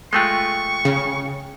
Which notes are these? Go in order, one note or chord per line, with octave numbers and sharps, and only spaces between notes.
G#3 A3 F4 G5 C#6 F#6
C#3